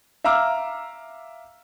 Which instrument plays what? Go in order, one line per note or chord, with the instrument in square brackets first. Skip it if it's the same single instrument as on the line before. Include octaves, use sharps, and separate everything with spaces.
[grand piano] E5 F5 A#5 D6 E6 F6